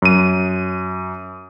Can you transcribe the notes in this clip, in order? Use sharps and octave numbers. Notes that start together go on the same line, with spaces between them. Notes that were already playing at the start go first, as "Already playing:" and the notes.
F#2 D#7